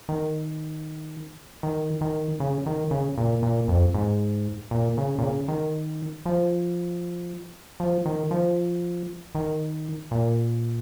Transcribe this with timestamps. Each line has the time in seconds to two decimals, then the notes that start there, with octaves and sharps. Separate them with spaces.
0.09 D#3
1.63 D#3
2.01 D#3
2.40 C#3
2.66 D#3
2.91 C#3
3.18 A#2
3.43 A#2
3.68 F2
3.94 G#2
4.71 A#2
4.97 C#3
5.18 A#2
5.23 C#3
5.48 D#3
6.26 F3
7.80 F3
8.06 D#3
8.31 F3
9.35 D#3
10.11 A#2